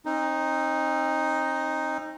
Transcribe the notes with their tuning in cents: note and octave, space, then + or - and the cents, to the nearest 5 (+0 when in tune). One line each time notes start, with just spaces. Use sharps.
C4 +40 D#4 +0